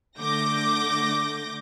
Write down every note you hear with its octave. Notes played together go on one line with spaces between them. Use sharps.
D3 A3 D6 G6 A#6